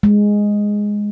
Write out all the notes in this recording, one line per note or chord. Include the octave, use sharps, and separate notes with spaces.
G#3